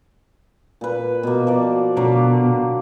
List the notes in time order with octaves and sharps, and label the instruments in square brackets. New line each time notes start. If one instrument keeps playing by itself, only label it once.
[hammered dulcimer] A#2 B4
B2 A#3
F3 D5
[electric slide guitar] B2 [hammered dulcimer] D3 F#3 A#3